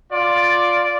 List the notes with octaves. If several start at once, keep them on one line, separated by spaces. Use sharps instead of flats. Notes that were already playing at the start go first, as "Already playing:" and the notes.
F4 D5